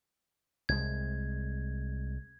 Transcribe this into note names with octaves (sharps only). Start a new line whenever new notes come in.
C2 G#3 G#6